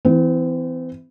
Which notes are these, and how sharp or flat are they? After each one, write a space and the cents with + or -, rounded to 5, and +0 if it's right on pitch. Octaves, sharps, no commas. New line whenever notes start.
E3 +0 C4 -40